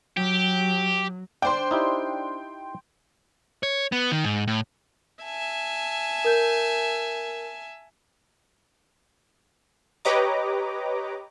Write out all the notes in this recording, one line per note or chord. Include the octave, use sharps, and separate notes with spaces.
F#3 G4
D4 C5 G5 C6
D#4 E4 G4
C#5
B3
D#3
G#2
A2
E5 G#5 A5
A#4 G6
G4 B4 C#5 D#5 A#5 D6